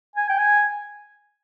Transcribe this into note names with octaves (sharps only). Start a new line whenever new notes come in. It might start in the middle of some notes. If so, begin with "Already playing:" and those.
G#5
G5
G#5